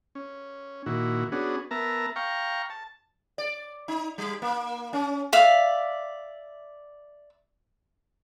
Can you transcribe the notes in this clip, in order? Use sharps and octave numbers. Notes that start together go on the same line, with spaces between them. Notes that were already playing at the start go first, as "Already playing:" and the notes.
C#4
A#2 D#3 E4 F#4
B3 C#4 D4 F#4 G#4
B3 A#4 E5 A5 A#5
F5 G5 A#5 C#6
A5
D5
D#4
G3
A#3
C#4
D5 E5 F5